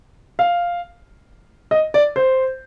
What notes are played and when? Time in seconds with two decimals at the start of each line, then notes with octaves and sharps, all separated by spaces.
0.39 F5
1.71 D#5
1.94 D5
2.16 C5